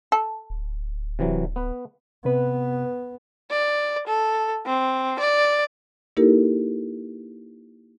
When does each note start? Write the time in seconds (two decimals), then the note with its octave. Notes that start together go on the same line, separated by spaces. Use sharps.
0.12 A4
0.50 D1
1.19 C3 E3 F#3
1.56 B3 B4
2.25 C3 B3 B4
3.51 D5
4.07 A4
4.66 C4
5.20 D5
6.17 A#3 D#4 E4 G4 A4 A#4